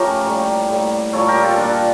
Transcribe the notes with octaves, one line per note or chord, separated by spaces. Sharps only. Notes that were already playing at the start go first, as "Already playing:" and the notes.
Already playing: C#3 F3 A3 G4 A#4 C#5
A2 G3 A#3
A2 G3 A#3
A#2 G3 A#3 A4 C#5
G4 A#4
F4 A4
A#2 G3 A#3 D4